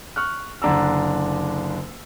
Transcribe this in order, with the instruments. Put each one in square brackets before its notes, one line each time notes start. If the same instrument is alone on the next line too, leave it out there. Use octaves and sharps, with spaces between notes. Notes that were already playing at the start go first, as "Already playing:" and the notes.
[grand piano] C#6 F6 F#6
F#1 D3 D4 A#5 E6